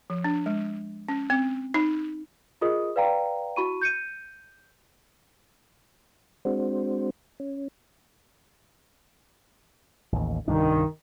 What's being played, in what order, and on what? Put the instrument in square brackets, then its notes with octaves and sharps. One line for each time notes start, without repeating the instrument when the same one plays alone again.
[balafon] F3
D4
G#3
C#4
C4
D#4
[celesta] F4 G#4 A#4 D#5 D#6
B4 D5 F5 G5 A#5
E4 F#4 B5 C#6 D#7
G6 C#7 D#7
[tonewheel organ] G#3 C4 D4 F#4 C5
C#4
[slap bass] A1 D#2
[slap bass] C2 G2 D4 [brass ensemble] D#3